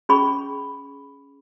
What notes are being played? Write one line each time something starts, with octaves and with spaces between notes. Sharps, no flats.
C#4 G#4 B5 C#6